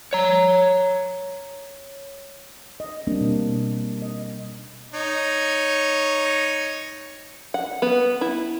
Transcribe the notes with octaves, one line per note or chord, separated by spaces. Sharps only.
C#5 A#5
D#5
G3 A#3 C4 D4
B2
D#5
D#4 C#5
F#5
B3
E4